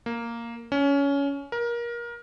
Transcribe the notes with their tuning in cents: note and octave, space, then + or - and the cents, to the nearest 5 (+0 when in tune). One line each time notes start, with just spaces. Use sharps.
A#3 -5
C#4 +20
A#4 +25